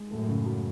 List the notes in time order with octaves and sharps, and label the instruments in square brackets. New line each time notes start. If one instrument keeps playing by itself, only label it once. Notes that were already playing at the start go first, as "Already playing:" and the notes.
Already playing: [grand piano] G#3
[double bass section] F#2 A2 [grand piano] A3
[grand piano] C#3
F#3